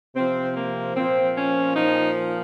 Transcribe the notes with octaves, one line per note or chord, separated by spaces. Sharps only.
C3 F3 C4
A#3
A#2 F3 C4
C#4
A#2 F3 D#4